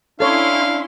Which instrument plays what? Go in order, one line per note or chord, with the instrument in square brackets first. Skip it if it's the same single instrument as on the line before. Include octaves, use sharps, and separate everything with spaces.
[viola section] C#4 E4 C6 [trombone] D4 [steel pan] A4 C#5 [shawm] F5